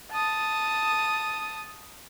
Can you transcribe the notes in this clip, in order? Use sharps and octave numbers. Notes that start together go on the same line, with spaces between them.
A5 D#6